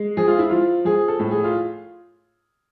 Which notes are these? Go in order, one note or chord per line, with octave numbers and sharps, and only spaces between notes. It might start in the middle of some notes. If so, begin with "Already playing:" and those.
Already playing: G#3
F3 G#4
F4
E4
F3 F4
F3 G#4
A4
A2
G#4
F4